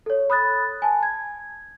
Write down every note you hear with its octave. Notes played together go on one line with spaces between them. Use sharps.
A4 C#5
B5 D#6 F#6 A6
G#5 A5
G#6